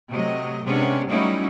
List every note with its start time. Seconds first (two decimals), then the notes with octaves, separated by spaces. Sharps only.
0.10 C3 F#3 A3 D#5
0.64 C3 G#3 B3 C#4 D4
1.10 F#3 G3 A3 C#4 D#4 E4